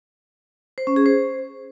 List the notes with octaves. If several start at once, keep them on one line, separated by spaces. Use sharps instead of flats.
C5
C#4
G#4
C5